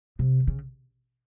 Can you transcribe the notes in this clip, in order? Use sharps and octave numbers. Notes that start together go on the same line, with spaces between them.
C3
C#3